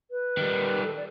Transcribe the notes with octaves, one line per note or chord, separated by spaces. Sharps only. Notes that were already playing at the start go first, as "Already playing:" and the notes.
B4
D#3 G3
A4
D5